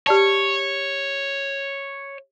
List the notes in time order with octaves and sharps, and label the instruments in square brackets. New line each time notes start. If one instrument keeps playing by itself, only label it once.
[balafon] G4 D5 A5 [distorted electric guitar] C#5